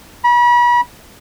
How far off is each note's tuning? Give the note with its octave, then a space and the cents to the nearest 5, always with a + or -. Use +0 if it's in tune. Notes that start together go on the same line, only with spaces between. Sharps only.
B5 -40